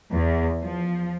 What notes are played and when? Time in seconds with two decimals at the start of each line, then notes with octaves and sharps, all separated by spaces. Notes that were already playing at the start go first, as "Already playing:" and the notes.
0.12 E2
0.62 F3